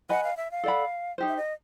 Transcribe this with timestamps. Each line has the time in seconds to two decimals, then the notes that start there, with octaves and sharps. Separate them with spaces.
0.09 B4 D#5 F#5 G#5 B5
0.24 F5
0.37 E5
0.51 F5
0.63 A4 D5 F#5 B5
1.18 D#4 G4 C5
1.28 E5
1.37 D#5